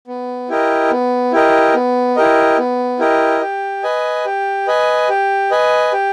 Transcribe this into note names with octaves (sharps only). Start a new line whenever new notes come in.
B3
E4 G4 A#4 D#5
B3
E4 G4 A#4 D#5
B3
E4 G4 A#4 D#5
B3
E4 G4 A#4 D#5
G4
B4 D#5 G#5
G4
B4 D#5 G#5
G4
B4 D#5 G#5
G4